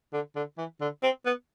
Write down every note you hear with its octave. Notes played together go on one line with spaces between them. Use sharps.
D3
D3
E3
D3
C4
B3